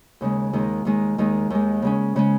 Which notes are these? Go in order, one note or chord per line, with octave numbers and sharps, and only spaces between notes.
D#2 C#3 G#3
D#2 D#3 G#3
D#2 D#3 G#3
D#2 D#3 G#3
D#2 D#3 G#3
C#3 G#3 C#4
C#3 G#3 C#4